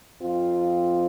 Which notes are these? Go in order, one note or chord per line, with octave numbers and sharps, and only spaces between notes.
F2 F3 C4 F4